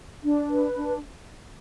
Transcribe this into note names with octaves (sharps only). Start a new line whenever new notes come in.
D4
B4
D4